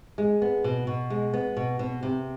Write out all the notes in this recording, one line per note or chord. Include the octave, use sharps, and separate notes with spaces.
G#3
B3
B2
B2
G#3
B3
B2
B2
C3